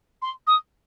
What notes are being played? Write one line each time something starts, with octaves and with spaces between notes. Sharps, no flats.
C6
D#6